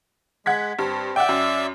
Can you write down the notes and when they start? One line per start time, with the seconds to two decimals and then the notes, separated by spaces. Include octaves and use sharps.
0.46 G#3 F#5 G#6 B6
0.79 G2 C4
1.16 D5 E5 F#5 G5
1.29 F#2